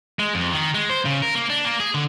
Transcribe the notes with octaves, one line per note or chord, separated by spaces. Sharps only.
G#3
F2
D#3
G#3
C5
C#3
A#4
A#3
D4
A#3
G#4
D3